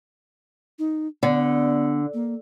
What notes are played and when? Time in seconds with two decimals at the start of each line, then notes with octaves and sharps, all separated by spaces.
0.79 D#4
1.23 D3 B3
2.14 A#3